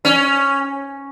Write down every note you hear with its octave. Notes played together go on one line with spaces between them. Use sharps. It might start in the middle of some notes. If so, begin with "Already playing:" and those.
C#4